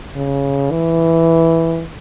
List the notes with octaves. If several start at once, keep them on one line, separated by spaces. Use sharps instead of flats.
C#3
E3